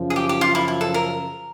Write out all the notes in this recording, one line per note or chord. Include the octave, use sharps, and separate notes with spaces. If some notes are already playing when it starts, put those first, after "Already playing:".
Already playing: F#2 C#3 F3
G#4
G4
G4
F4
E4
E4
A4
A#4